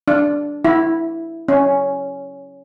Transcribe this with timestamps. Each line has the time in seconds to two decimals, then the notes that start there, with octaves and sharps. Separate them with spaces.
0.08 D4
0.65 E4
1.48 C#4